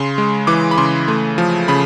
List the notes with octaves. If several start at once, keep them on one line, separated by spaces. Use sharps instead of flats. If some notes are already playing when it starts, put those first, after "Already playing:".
Already playing: C#3 C6
G#3
E3 D6
B5
C#3 C6
A3
F3
C#3 B5